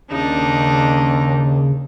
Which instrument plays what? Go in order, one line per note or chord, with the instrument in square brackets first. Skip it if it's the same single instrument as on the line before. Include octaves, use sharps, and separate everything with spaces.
[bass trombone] D#2 [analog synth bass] C#3 [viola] D4 D#4